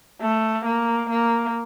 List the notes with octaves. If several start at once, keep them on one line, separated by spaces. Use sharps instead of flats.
A3
A#3
A#3